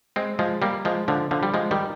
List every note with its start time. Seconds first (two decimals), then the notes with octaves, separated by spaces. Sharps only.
0.16 G#3 C4
0.39 F3 G#3
0.62 G3 A#3
0.85 F3 G#3
1.08 D3 F3
1.31 D3 F3
1.43 G3
1.54 F3 G#3
1.71 D#3 G3